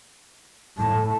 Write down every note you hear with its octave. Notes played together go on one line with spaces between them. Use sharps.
A2 A5